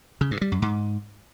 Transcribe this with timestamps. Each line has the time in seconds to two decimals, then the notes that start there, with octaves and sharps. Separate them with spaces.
0.21 C#3
0.31 G2
0.41 G3
0.52 F#2
0.62 G#2